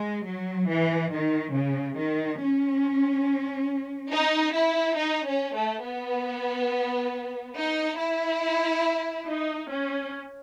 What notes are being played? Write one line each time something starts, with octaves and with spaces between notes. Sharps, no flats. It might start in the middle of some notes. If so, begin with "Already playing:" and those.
Already playing: G#3
F#3
E3
D#3
C#3
D#3
C#4
D#4
E4
D#4
C#4
A3
B3
D#4
E4
D#4
C#4